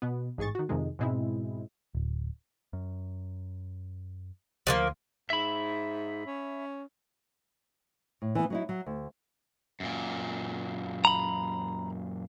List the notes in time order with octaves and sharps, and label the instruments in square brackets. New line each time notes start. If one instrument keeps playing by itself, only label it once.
[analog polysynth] B2 B3
A1 G#2 G#4 C#6 A6
D#3 F#4
F2 C3 D#3 G#3
G#2 B2 G#3 C4 E4
[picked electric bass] D1
F#2
[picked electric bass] D2 [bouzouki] F3 G#3 A#3
[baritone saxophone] G#2 [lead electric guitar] E5 B5
[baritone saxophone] C#4
[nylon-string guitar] A2
E3 B3
F#3 D#4 E4
F#3
D2
[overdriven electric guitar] F#2 A#2
[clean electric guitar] A#5 B5